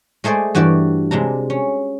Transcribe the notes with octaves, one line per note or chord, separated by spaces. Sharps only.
G#3 A3 G#4 C5 D5
G2 E3 F#4 G4 D5
C3 G#3 D4 A#5
C#4